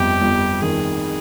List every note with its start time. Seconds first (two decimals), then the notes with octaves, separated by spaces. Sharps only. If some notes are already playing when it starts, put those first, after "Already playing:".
Already playing: G1 F2 G4
0.22 G1
0.62 D#3 G#4